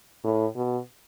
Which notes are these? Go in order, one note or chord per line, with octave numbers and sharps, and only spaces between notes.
A2
B2